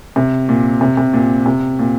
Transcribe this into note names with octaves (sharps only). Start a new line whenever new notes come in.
C3
A#2
C3
C3
A#2
C3
A#2